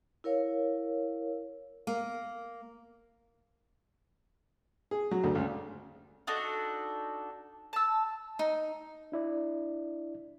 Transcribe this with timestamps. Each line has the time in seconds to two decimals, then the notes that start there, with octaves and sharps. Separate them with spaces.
0.24 E4 A#4 C#5 F5
1.87 A#3
4.91 G#4
5.11 F#3
5.24 D2
5.35 C#2
6.27 D4 D#4 F#4 A4
7.73 A5 E6
8.39 D#4
9.12 D4 E4 D5